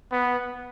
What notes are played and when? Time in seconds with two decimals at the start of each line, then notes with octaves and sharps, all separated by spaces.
0.12 B3